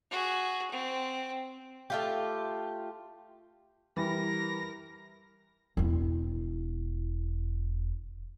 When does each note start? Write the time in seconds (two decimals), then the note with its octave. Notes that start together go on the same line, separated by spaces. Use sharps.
0.11 F#4 G#4
0.71 C4
1.90 A3 F4 G4
3.97 E3 G3 A#4 A#6
5.77 E1 E4